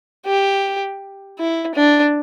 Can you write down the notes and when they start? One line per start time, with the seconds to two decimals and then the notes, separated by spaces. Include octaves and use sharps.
0.26 G4
1.38 E4
1.75 D4